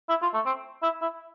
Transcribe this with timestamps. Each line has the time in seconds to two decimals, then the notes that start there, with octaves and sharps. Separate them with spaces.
0.09 E4
0.22 F4
0.34 A3
0.46 C4
0.83 E4
1.02 E4